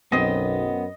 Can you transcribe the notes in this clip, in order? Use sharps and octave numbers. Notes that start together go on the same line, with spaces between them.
B1 F#2 B3 C4 D#5